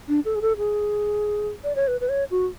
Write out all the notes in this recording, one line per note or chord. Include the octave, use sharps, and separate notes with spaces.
D4
A4
G#4
A4
G#4
D5
C#5
B4
B4
C#5
F#4